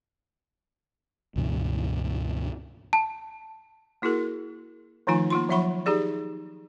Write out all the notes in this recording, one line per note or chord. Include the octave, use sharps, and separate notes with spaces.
C#2 G2 B2 E3
A5
A#3 E4 F#4 G#4 A#4
D#3 F3 A3 D#4 F4 G#5
A#3 F4 C6
F3 F#3 E5 F#5 B5 C#6
D#4 G4 G#4 D5